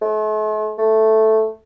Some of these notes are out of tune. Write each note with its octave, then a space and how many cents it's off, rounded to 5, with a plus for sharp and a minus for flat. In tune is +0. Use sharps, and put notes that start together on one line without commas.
A3 -45
A3 +0